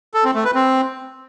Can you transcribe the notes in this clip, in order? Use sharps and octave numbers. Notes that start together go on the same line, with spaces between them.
A4
C4
A3
B4
C4